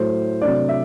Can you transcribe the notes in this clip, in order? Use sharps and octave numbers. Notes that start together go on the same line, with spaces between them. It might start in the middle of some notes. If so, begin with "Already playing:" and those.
Already playing: A2 F#3 A3 C5
C3 F#3 A3 D4 D5
E5